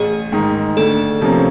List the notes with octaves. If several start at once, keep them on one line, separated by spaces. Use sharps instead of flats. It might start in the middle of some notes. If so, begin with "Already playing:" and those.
Already playing: A1 G#4
G#2 D#3
D2 A4
C3 F3 A#3 C#4